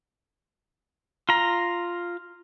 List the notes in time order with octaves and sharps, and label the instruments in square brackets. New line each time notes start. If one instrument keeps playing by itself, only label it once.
[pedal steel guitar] F4 A#5